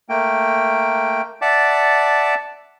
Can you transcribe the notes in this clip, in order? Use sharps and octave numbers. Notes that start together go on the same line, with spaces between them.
A3 A#3 G5
D5 E5 F#5 A5 D6